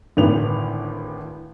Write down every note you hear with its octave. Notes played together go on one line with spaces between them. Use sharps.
G#1 D2 A2 B4 F7